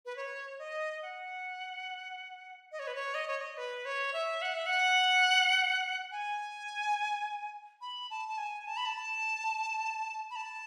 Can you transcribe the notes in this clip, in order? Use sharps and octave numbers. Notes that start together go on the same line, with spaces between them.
B4
C#5
D#5
F#5
D#5
C#5
B4
C#5
D#5
C#5
D#5
B4
C#5
E5
F#5
E5
F#5
G#5
B5
A5
A5
G#5
A5
B5
A5
B5
A5